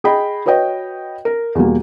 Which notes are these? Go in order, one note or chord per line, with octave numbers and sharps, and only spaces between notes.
G#4 D#5 G5 B5
F#4 B4 C#5 D#5 G5
A#4
E2 B2 G3 A#3